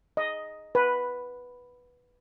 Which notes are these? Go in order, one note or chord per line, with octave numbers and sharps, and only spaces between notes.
D#5
B4